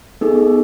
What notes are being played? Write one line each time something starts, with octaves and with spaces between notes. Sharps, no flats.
B3 D#4 G#4 A4